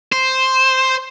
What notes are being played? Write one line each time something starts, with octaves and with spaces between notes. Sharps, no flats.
C5